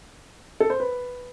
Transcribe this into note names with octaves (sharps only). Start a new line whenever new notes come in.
A4
C5
B4